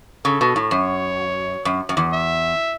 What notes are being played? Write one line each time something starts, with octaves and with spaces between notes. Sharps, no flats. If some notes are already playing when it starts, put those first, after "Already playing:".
C#3 A4
B2
A2
F#2 C#5
F#2
F#2
E2
E5